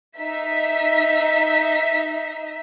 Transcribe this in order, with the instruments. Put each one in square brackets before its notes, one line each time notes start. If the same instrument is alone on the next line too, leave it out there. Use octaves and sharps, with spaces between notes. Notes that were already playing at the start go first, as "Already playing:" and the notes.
[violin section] D#4 E5 B6